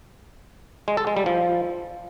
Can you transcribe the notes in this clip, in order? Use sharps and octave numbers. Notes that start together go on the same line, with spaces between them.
G#3
A4
G#3
G3
F3